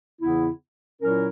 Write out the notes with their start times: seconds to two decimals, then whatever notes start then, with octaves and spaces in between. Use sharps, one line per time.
0.21 E2 C#3 E3 B3 E4
1.01 A#2 F#3 C#4 E4 A#4